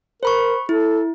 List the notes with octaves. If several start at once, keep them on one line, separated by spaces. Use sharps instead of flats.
A#4 C5 B5 C#6
E4 A4